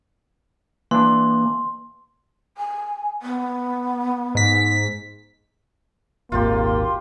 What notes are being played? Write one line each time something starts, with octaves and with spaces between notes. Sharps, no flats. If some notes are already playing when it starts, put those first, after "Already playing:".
E3 A#3 D4 C6
G#5
B3
G#2 B6
D#1 G#1 A#3 F4 G4 C6